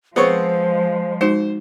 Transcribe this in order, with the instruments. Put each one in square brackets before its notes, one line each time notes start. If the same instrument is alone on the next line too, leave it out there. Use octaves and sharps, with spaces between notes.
[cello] F3 G#3 [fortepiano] B3 C4 C#5 [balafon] G#4 [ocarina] C5
[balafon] G#3 D#4 F#4 [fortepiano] C5